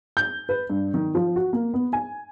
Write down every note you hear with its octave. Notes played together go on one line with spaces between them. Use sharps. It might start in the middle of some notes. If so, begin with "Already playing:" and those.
G6
B4
G2
D#3
F3
F#4
A#3
B3
G#5